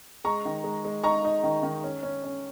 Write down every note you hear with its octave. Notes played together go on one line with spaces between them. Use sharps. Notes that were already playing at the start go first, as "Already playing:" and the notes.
G#3 A#5 C#6
D#3
G#3
G#3
D#4 A#5 C#6
D#4
D#3
D#3
C#4
C#4
C#4